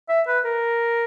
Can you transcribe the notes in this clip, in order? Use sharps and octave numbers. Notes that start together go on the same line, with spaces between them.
E5
B4
A#4